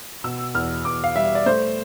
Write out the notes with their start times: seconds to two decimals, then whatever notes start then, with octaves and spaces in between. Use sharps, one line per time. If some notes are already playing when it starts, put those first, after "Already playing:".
0.24 B2 E6
0.55 E2 F6
0.85 E2 D6
1.04 F5
1.16 G3 E5
1.35 D5
1.46 A3 C5